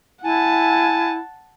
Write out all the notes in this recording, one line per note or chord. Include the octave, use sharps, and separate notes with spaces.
E4 F#5 G#5 A5